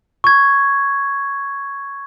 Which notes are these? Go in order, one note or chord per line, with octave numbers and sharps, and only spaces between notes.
C#6 G#6